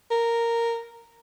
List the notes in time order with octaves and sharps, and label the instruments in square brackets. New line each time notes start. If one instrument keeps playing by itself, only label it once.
[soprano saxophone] A#4